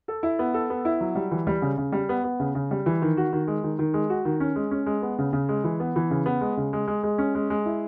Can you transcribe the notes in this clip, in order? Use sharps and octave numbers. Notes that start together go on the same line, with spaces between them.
A4
E4
B3
A4
B3
E4
F#3
G3
E3
G3
C#3
C#3
G3
B3
B3
C#3
C#3
G3
E3
D#3
F#4
D#3
G#3
D#3
D#3
G#3
F#4
D#3
C#4
G#3
C#4
G#3
B3
C#3
C#3
G#3
E3
B3
E3
C#3
B3
G#3
C#3
G#3
G#3
G#3
C#4
G#3
G#3
E4